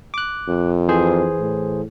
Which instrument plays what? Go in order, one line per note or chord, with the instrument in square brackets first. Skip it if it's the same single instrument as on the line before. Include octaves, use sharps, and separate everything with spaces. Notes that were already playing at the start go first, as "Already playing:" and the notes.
[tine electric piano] D6 F#6
[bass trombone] F2
[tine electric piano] E3 G#4 C5
[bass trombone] A2